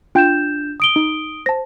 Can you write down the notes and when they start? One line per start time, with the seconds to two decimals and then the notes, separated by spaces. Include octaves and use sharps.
0.15 D4 F4 G5 G6 E7
0.80 D#6 D7 G7
0.96 D#4
1.46 C5 A5 A#6